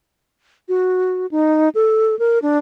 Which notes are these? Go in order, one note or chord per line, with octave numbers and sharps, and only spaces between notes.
F#4
D#4
A4
A#4
D4